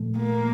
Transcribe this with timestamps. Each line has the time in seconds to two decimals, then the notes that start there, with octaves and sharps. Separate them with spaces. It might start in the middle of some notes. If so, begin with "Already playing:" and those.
Already playing: A#2 F3 A3
0.18 A#3